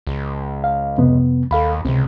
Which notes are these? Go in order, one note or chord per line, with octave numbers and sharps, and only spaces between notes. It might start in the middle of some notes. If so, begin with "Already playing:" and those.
C#2
F5
F2 C3 B3
D#2 A4 F5 B5
C#2 C3 C4